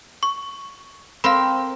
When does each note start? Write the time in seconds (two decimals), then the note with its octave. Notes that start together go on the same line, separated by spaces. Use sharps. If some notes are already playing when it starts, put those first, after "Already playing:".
0.23 C#6
1.24 C4 A#4 C5 F5 B5